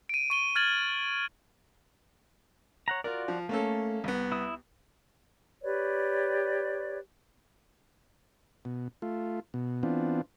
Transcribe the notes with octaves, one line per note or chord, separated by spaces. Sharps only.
D7 D#7
C#6 D#7 G7
F6 G#6 A6 F#7
C#5 F#5 A#5
F4 F#4 A#4 D5
F3
A3 A#3 C#4 A4
C2 B3
E4 D#6
G4 B4 C#5 D5
B2
A3 F4
B2
E3 B3 C4 D4 F4